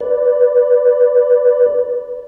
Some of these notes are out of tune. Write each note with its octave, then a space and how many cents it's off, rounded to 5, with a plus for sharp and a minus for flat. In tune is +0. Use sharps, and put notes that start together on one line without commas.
B4 +0 D5 -10